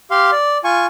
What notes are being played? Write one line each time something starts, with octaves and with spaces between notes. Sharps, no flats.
G4 F5 C6
D5
F4 G#5 C#6